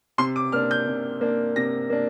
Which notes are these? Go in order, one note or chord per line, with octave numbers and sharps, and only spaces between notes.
C3 C6
D6
A#3 D4 F6
G6
C3
A#3 D4
C3 A#6
A#3 D4